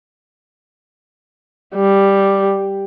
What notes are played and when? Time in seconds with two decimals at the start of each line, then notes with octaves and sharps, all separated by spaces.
1.75 G3